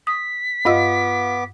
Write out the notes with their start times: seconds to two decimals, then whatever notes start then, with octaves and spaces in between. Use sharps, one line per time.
0.07 D#6 B6
0.65 G2 B3 F4 D#5 D6 E6